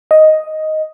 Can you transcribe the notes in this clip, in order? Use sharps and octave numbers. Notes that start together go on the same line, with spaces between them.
D#5